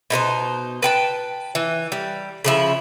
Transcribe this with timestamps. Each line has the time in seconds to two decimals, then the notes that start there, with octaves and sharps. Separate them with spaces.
0.10 B2 D#4 A#4 C5
0.82 B4 G5 A5
1.55 E3
1.92 G3
2.45 C#3 F3 E4